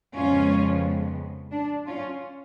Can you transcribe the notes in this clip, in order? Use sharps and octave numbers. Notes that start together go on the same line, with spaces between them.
F2 C#3 G#3 B3 C#4 F4
D4
C#4 F4